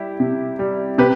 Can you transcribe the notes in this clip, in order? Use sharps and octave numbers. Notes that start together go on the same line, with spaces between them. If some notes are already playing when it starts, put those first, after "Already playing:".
Already playing: G3 E4 G4
C3
G3
C3 G4 B4